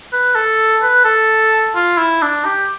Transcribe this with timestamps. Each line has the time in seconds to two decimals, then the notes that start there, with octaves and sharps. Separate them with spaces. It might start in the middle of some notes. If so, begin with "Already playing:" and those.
0.12 B4
0.35 A4
0.82 B4
1.05 A4
1.75 F4
1.98 E4
2.22 D4
2.45 G4